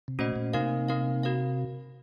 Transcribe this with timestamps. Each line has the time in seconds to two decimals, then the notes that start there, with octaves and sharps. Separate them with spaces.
0.08 C3
0.19 A#2 A3 C#4 F#4 C5 D#5
0.36 A#2
0.53 C3 A#3 D#4 A#4 F5
0.88 A#3 D#4 A#4 F5
1.23 F#4 A#4 F5